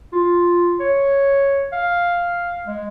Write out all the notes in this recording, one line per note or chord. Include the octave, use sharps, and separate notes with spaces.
F4
C#5
F5
G#3